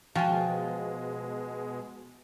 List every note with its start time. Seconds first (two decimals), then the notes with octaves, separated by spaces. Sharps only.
0.15 B2 F3 G#3 F#4 G5 G#5